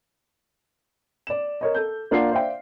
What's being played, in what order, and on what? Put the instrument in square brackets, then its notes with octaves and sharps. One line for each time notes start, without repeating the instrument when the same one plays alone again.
[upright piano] D5 E7
A#4 C#5 D#5
A4 G6
A#3 D4 F4 F5 F#5 C7
C5 D5 E5 F5 G5